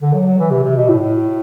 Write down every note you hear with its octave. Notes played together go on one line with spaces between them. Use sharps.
D3
F#3
F#3
E3
C3
C3
B2
A2
A2